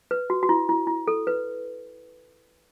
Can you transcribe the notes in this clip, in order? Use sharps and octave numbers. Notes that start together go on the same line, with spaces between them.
B4
F#4
F#4
E4
E4
E4
A4
B4